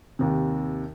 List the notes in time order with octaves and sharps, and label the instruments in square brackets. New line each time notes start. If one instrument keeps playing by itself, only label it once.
[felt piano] D#2 C3